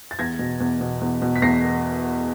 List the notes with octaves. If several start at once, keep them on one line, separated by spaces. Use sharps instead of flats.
A6
E2 G#6 A#6
B2
E2
B2
E2
B2
B6
E2 A#6 C7